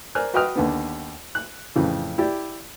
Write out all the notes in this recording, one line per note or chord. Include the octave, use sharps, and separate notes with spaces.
A#4 C5 D5 G#5 F6 F#6
F#4 B4 D#5 G5 D#6 F6
D#2 D3 B3
F#6
F2 A2 C#3 E3
E4 G4 D5